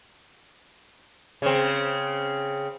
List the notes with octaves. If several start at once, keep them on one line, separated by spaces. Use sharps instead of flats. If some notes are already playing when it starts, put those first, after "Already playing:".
C#3 C4